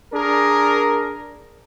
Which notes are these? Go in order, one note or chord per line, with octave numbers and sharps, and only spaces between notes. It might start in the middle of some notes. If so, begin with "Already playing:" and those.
D4 G#4 A#4